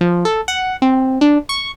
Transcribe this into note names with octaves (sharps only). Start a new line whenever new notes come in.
F3
A4
F#5
C4
D4
C#6